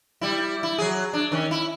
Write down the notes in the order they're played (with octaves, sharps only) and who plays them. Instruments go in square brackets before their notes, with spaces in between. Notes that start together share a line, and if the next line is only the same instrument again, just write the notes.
[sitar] G3 E4
E4
F#3 G#4
D4
D#3 C#4
E4